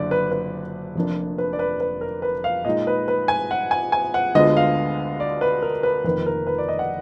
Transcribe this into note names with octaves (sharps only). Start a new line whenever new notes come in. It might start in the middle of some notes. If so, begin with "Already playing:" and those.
Already playing: F#1 D3 D5
B4
B4
F1 F2 F3 A#3 D4
B4
D5
B4
B4
A#4
B4
F5
A#2 G#3 D#4 D#5
B4
B4
G#5
F#5
G#5
G#5
F#5
D2 D3 G#3 B3 F4 D#5
F5
D5
B4
A#4
B4
F1 F2 D#3 A#3 B4
A#4
B4
D5
D#5
F#5